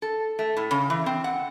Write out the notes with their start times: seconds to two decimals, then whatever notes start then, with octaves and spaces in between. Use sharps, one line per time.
0.02 A4
0.39 A3
0.57 A2
0.71 C#3
0.90 E3
1.06 C4
1.24 F#5